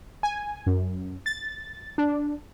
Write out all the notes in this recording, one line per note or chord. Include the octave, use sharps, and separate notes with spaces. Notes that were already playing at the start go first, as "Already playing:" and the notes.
G#5
F#2
A6
D4